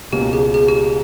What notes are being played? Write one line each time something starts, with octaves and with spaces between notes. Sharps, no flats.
C#2 B2 A#3 C#4 G4
G#4
G#4
G4